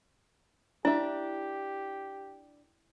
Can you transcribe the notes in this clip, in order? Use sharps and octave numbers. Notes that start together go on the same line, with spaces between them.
D4 E4 G4 E5